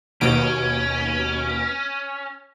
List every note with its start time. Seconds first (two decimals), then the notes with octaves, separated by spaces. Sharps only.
0.21 D#2 B2 C#4 D7